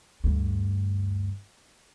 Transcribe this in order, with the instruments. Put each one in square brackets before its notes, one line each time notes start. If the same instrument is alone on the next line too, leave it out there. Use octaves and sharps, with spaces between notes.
[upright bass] D2 G2